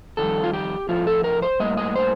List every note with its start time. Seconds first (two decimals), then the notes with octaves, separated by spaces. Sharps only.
0.17 F2 D#3 G3 A4
0.44 F4
0.53 G4
0.89 A2 F3 A3 F4
1.07 A4
1.24 A#4
1.42 C5
1.60 A2 G3 A#3 D#5
1.77 D#5
1.96 C5